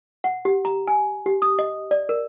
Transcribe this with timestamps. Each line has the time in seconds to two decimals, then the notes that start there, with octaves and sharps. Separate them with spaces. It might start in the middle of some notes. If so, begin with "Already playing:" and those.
0.24 F#5
0.45 G4
0.65 A#5
0.88 G#5
1.26 G4
1.42 D#6
1.59 D#5
1.91 D5
2.09 A#4